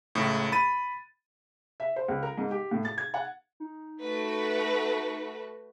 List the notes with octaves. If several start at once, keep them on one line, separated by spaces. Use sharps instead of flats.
C#2 A2
B5 A6 D#7
E5
C5
C#2
A#4
G#2
G4
A2
A6
G#6
F#5
D#4
A3 F#4 B4